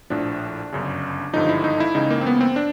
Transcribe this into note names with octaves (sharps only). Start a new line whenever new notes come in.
A#1 A2 F3 D4
G1 F#2 C#3
G#1 G2 D3 F3 D#4
E4
D#4
E4
C#2 C#3 E3 D#4
A#3
C4
B3
C4
D4